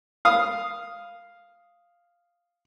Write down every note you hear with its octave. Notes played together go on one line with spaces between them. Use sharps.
F5 D#6